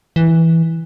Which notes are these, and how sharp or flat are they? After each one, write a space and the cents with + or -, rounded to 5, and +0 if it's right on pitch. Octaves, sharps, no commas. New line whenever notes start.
E3 -5